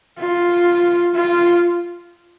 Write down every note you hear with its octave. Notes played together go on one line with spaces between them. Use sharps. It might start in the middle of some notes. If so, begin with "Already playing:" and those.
F4
F4